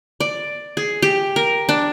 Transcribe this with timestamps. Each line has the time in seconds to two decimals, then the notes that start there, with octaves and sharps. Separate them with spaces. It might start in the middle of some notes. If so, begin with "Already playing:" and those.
0.20 D5
0.77 G#4
1.02 G4
1.36 A#4
1.69 D4